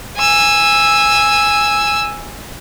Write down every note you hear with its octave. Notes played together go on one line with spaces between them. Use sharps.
G#5 E6